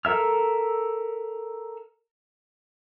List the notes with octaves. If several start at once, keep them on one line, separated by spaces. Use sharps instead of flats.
A4 A#4 E5 F6